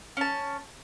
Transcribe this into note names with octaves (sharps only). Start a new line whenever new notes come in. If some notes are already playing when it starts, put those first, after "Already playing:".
C#4 A5